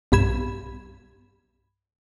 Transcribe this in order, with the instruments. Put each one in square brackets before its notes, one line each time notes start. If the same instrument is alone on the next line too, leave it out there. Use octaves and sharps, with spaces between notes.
[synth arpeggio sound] B1 G2 B5 G#6 E7